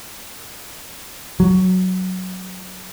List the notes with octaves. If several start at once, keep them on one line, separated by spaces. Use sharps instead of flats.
F#3